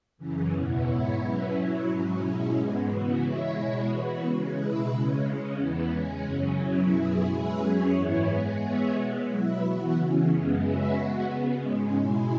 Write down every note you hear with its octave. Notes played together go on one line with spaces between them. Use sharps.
F#2 C#3 E3 C#4
E2 B2 B3 E4
G#2 G#3 B3 E4 C#5
B2 F#3 C#4 E4 B4
F#3 E4 C#5
G#2 F#3 C#4
B2 G#3 C#4 E4
G#2 G#3 B3
C#3 E3 B3 F#4
G#3 E4 C#5 E5
B2 G#3 E4 C#5
E3 B3 F#4 B4
C#3 G#3 C#4
B2 G#3 E4 B4 E5
C#3 G#3 C#4
C#3 G#3 C#4
E2 E3 B3 E4
G#3 C#4 G#4
F#2 C#3 F#3 C#4
B2 F#3 C#4 E4
F#2 F#3 B3 E4 G#4
G#3 C#4 G#4 B4 E5
F#2 F#3 C#4 G#4 C#5
G#2 E3 B3 E4 C#5
G#3 B3 G#4
G#3 B3 G#4 C#5 E5
B2 G#3 B3
F#3 E4 B4 E5
E3 B3 F#4
C#3 E3 C#4
F#2 C#3 G#3 B3
G#3 C#4 F#4 B4 E5
G#3 B3 F#4
C#3 G#3 B3
G#2 G#3 C#4
B2 G#3 E4 G#4